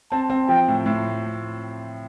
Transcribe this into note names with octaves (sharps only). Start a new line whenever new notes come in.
C4 A5
C4
F3 G5
A2
A2